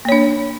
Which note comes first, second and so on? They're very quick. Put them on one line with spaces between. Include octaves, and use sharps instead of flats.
A#3 C#5 D4